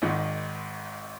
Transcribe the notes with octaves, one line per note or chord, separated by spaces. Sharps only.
G#1 G#2 D#3